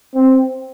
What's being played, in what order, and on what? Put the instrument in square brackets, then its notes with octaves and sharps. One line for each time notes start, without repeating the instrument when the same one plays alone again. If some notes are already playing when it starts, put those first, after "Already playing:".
[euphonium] C4